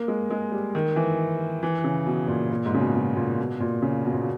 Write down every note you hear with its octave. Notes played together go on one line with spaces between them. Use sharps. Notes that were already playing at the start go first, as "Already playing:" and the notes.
Already playing: A#3
G#3
G#3
G3
D#3
E3
E3
C#3
B2
A#2
A#2
G#2
C#3
B2
B2
A#2
B2
A#2
C#3
B2
A#2
B2